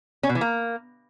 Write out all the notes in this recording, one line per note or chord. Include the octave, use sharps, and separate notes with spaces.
C#4
B2
E3
A#3